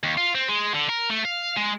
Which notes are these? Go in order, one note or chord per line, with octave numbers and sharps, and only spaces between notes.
D#2
F4
C4
G#3
D3
A#4
A3
F5
G#3